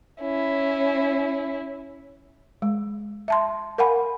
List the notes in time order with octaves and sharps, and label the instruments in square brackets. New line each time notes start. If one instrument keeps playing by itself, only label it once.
[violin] C#4 E4
[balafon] G#3
E5 A5 C6
A#4 F5 F#5 G#5 B5